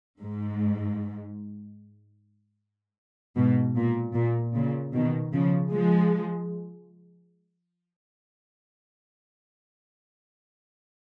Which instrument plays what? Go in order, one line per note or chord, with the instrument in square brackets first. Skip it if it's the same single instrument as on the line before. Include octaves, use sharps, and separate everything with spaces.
[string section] G#2
G#2 B2
A#2
A#2
A#2 C#3
B2 D#3
C#3 F3
F3 G#3